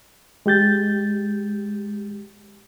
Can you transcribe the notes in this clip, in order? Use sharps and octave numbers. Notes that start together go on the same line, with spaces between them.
G#3 G4 G6 A6